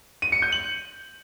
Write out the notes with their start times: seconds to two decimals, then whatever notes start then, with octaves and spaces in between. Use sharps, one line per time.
0.22 D#7
0.32 C#7
0.42 G6
0.52 F#7